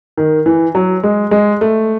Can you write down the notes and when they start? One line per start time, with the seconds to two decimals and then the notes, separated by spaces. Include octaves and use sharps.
0.17 D#3
0.46 E3
0.75 F#3
1.04 G#3
1.31 G#3
1.61 A3